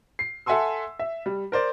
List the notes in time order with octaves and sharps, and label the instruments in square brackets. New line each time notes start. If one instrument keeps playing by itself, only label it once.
[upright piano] C7
A4 E5 F#5 G#5 C6 E6
E5
G3
A#4 C5 D5